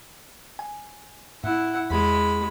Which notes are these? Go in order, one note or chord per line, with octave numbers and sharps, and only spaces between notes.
G#5
A2 E4 F#5
E2 G#3 B5